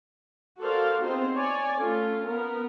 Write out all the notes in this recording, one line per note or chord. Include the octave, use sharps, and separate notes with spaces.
F#4 A4 A#4 C5 D5 F5
B3 C4 D#4 F4 G#4 C5
C#5 D5 G#5
A3 C#4 F4 A4
B3 A#4